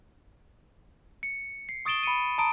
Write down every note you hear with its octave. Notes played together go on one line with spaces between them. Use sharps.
C#7
C7
C#6 D#6 A6 D7 E7 G7
B5 C#7 D#7
A5 A#5 D#6 D7